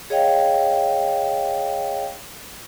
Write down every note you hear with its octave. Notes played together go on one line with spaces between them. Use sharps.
G#4 C#5 D#5 F5 G5